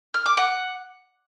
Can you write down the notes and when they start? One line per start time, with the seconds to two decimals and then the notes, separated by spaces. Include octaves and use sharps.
0.14 F6
0.26 D6
0.37 F#5